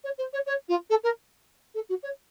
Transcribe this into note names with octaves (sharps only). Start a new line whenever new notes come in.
C#5
C5
C#5
C#5
F4
A4
A#4
A4
F#4
C#5